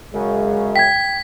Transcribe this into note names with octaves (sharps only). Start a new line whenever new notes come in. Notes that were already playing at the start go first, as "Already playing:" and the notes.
F#2 C#3 G#3
G5 G#6 B6